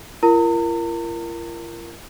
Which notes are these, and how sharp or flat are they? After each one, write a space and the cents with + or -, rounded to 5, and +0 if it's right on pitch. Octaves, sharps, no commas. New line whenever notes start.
F4 -45 A#4 +0 A#5 -45